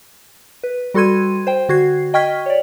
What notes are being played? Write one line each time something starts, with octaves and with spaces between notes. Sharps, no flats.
B4
G3 F#4 A4 C6 G#6 D#7
C5 G5
D3 F#4 G#6 C7
D#5 G5 C#6 F6 G#6 B6
C#5 D5